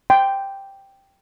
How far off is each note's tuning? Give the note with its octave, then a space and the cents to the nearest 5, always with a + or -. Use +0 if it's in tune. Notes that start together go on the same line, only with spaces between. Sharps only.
G5 +0 C6 -25